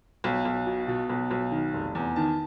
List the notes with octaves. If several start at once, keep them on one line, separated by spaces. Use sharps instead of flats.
B1
B1
B2
B2
B1
B1
D#3
F1
E2
D#3 A5